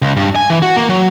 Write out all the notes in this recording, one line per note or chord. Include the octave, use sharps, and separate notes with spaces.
C#2
G2
G#5
E3
F#4
A#3
F#3